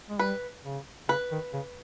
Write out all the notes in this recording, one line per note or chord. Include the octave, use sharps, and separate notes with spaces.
G#3
G3 B4
C#3
C#3 B4
D#3
C#3